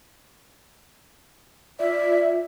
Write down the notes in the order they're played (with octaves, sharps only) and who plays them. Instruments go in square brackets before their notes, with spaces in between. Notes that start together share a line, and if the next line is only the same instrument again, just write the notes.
[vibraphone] F4 [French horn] D5 [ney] E5